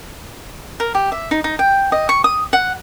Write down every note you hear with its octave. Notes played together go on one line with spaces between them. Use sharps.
A#4
G4
E5
D#4
D#4
G5
D#5
C#6
D#6
F#5